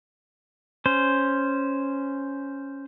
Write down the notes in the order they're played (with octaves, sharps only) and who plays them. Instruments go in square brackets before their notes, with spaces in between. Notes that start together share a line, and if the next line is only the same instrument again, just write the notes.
[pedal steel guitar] C#4 C5